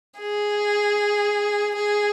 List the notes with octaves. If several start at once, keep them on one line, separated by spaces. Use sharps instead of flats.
G#4
G#4